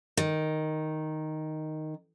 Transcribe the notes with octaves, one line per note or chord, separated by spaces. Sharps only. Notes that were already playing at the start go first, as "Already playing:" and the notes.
D#3